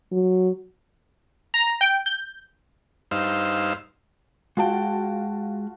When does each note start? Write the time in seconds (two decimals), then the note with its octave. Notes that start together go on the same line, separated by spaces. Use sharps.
0.12 F#3
1.54 A#5
1.81 G5
2.06 G6
3.11 G2 D#4 C5 F5 E6
4.57 G#3 F4 F#4 G#4 G5 A5